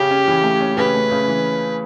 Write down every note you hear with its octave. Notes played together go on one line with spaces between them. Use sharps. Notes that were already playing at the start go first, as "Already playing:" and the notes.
Already playing: C#3 C#4 G4
C#4
E3
A3
C#4
C#3 B4
A3
C#3
E3